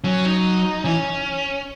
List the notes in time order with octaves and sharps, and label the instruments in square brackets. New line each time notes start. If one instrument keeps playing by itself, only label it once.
[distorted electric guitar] F#3 [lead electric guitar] C#4
[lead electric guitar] D#4
[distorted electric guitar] E3 [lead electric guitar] C#4